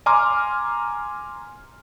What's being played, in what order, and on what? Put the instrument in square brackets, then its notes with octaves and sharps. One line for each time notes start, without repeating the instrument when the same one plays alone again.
[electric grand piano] G#5 A#5 C6 D6 F6